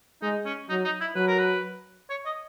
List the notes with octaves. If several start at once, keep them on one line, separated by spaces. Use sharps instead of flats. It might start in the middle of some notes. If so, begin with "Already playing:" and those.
G#3 D#4
C#4
F#3 D#4
D#4
E4
F#3 B4
A#4
B4
C#5
D#5